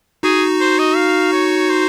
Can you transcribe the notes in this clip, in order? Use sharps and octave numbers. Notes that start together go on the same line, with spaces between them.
D#4 F#4 G#4
C5
D#5
F5
C#5
C5